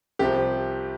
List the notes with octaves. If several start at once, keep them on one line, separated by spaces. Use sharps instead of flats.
C2 C3 F3 G4